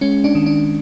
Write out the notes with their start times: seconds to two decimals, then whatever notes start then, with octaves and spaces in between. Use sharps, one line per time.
0.01 G#3 C#4
0.24 D4
0.35 D#3
0.46 D4